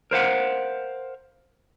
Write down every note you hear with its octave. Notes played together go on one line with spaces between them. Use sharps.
A#4 C5 F5 F#5